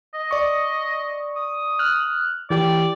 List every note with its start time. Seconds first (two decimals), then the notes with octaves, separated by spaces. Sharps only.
0.14 D#5
0.31 D5 C#6
1.36 D#6
1.79 F6 F#6
2.50 E3 G4 D5 G5